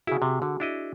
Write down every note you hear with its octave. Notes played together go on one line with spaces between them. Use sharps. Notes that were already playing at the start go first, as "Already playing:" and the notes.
C#3 E4 F#4 G#4
C3
D3 F#4
D4 E4 D#5